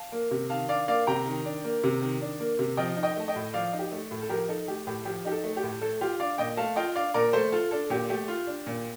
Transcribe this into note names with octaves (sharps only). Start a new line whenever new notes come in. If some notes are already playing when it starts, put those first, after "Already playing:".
Already playing: F5 A5
A#3
C3
D#3 F5 A5
D4 D5 F5
A#3 D5 F5
C3 G5 A#5
D#3
D4
A#3
C3
D#3
D4
A#3
C3
F3 D#5 G5
D#4
D#5 G5
A3 A5
D#5 G5
A2
F3 D5 F5
D#4
G4
A3
A2
A4
F3 G4 A#4
D#4 A4
A3 G4
A2 G4
F3 G4
D#4 G4
A4
A3
G4
A2
A3 A4
F4 G4
D4 D5 F5
A#2 D#5 G5
A3 F5 A5
F4 D#5 G5
D4 D5 F5
A#2 A#4 D5
A3 A4 C5
F4 A4
D4 A4
A#2 G4
A3 G4
F4
D4
A#2